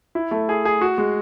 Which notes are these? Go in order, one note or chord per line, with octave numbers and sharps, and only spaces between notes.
E4
A3
G#4
G#4
F#4
G#3